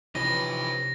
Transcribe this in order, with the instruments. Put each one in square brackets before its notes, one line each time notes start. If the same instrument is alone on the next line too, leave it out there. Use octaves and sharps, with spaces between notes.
[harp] C3 [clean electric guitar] E3 F3 C#4 [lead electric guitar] D#4 B4 [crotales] A#6